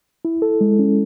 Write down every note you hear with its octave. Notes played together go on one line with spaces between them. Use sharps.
E4
A4
G#3
C#4